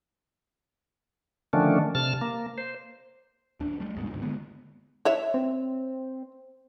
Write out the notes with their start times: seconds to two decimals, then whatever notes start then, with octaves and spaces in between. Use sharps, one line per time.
1.53 D3 D#3 F3 A3 C#4 D4
1.95 C3 A5 F6
2.21 A#3
2.58 C5
3.60 D1 D#2 D4
3.80 G3 A3
3.96 A1 D#2 G#2 B2
4.11 D2 G#2
4.22 D3 G#3 A#3 B3
5.05 E4 C#5 E5
5.34 C4